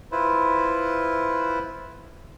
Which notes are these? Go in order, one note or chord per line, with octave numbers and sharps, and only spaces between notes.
E4 F4 B4 C5